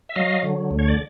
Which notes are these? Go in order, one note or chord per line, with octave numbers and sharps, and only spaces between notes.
E5
F#3 D#5 F5
D3
D2
C#5
D5